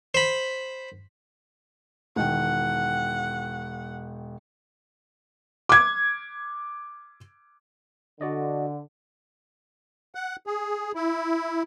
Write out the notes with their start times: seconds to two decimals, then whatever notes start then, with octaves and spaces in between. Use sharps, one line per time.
0.14 C5 B5
2.16 E1 D#3 F#5 G5
5.69 D6 G#6
8.21 D3 F#4 D5 D#5
10.15 F#5
10.47 G#4
10.95 E4